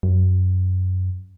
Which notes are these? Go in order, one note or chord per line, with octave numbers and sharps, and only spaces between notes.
F#2